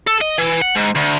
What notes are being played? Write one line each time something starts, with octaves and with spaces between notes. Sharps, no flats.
A4
D#5
E3
F#5
G#2
D2